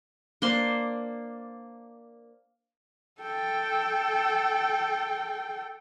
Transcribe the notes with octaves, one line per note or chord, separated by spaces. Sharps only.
A#3 D4 C5 C6
A4 G5